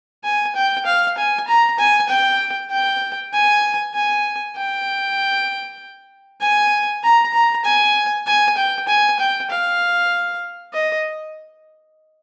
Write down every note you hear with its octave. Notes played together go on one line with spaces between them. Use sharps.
G#5
G5
F5
G#5
A#5
G#5
G5
G5
G#5
G#5
G5
G#5
A#5
A#5
G#5
G#5
G5
G#5
G5
F5
D#5